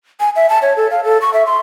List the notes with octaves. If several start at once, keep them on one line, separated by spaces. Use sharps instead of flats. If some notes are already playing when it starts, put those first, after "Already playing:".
G#5
E5
A5
C#5
A4
F5
A4
C#6
E5
C6